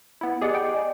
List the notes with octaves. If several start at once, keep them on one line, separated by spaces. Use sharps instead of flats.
B3 E4
G4 G#4 D5 D#5 F#5 D6
G5
D5 D#5 G#5